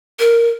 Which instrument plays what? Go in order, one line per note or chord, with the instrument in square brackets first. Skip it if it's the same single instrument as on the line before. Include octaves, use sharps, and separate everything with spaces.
[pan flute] A#4